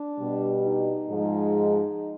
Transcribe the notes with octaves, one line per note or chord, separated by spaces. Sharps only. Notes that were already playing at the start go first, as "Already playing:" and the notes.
Already playing: D4
B2 G3
D#4
G#2 F3 G#3